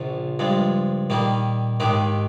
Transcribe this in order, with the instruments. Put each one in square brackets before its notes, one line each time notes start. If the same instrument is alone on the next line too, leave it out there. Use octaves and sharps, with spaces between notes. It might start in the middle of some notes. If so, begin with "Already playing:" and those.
Already playing: [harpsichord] A#1 A#2 F3 [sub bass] C#3
[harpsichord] G2 F3 G#3
[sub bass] A#2 [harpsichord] D#3 G3 A#3 D#4
[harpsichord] D#2 D#3 G#3 D#4 G4 [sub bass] G#2